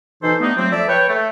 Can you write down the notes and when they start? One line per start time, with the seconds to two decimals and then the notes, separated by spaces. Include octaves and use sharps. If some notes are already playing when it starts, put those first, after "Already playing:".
0.22 B2 E3 D#4 A4 C5 C6
0.41 G3 A3 B3 D4 D#4
0.56 F3 F#3 A3 C4
0.71 F2 F3 D5 E5
0.88 B4 C#5 G5
1.08 A3